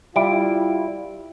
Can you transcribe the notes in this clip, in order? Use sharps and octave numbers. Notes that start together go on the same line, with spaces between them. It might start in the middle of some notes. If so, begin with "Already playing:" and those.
G3 E4 F4 E5 D7